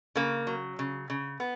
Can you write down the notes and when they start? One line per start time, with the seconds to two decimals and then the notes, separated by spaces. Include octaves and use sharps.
0.16 C#3 A#3
0.47 F#3
0.79 C#3
1.10 C#3
1.40 B3